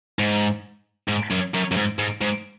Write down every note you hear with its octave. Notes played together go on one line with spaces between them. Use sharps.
G#2
G#2
F#2
F#2
F#2
G#2
G#2
G#2